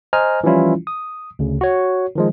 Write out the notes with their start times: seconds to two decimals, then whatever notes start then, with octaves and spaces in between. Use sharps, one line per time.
0.13 C5 D#5 G#5 A#5 F6
0.44 E3 F3 G3 C#4 E4 F4
0.87 D#6
1.39 D2 C#3
1.61 F#4 C#5
2.15 D#3 F3 G#3